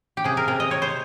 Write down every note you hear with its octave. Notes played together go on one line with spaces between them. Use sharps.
G4
C3 G#4
A#4
C3 A#4
D#5
C3 C#5
C5